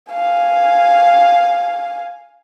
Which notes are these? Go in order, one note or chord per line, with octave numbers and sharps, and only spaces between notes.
F5 G#5